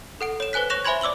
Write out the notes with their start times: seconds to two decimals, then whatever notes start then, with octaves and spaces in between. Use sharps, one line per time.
0.21 A4 F#5 D7
0.40 C#5 E7
0.53 B4 C5 G#5 F#6 B6
0.70 C#5 C#6 F#6 A#6 E7 F7
0.85 C5 E5 G#5 B5 C6 G#6
1.01 D5 D6 E6 F#7 G7